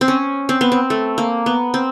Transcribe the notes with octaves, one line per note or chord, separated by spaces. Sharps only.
C4
C#4
C4
B3
C4
A3
A#3
B3
C4